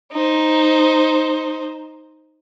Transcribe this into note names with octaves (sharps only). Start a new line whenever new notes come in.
D#4 C5